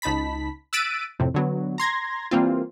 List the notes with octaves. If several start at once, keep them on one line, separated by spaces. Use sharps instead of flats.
C#2 D#4 A5 B5 B6
E6 F#6 A6 B6 D7 D#7
F2 A2 C3
D3 F#3 B3
A#5 C6 G#6 A#6
E3 G3 A#3 C4 F4